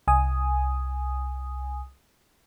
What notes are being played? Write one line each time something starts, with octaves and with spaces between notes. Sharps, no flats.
C2 G#5 D#6